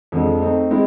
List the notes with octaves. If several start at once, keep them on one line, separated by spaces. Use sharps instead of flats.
F2 D3 F3 G#3
A3 C4 D#4
G#3 C4 E4